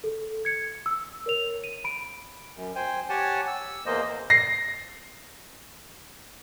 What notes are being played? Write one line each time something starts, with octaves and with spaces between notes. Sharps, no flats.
A4
G#6 C#7
E6
A#4 C#5 F7
D#7
B5 D7
F#2
C5 G5 G#5
G4 C#5 F#5 G#5 A5
E6
E2 E3 A#3 C5 D#5
A#6 C7